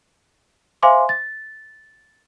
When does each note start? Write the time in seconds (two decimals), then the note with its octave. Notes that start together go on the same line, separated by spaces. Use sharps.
0.83 C5 E5 F5 G#5 C6 D6
1.09 A6